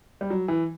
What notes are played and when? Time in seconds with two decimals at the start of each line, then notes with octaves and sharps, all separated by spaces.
0.21 G3
0.30 F#3
0.48 E3